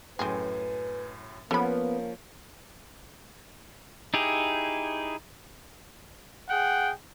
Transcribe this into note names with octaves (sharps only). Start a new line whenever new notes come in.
F#2 A2 C4 G#4 B4 G#5
F3 A#3 B3 C#4 A4 B5
D#4 E4 G4 G#4
G#4 F#5 G5